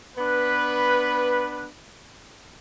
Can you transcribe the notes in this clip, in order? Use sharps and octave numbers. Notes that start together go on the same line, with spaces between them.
B3 D4 B4